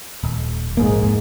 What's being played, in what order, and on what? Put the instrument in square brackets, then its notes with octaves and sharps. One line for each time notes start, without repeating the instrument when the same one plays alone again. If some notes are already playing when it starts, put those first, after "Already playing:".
[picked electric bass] D#1
[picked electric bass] E1 A#1 A#3 [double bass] G#2